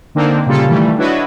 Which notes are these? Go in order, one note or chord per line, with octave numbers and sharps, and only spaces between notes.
D3 A#3 C4 D4 D#4
A#2 C#3 G3 A#3 F4 A4
D#3 E3 G3 A3
D4 E4 F#4 B4 C#5 D#5